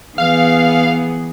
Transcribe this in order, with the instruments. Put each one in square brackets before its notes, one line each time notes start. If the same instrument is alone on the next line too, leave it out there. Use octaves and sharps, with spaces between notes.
[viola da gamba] E3 B3 G#4 [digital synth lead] F5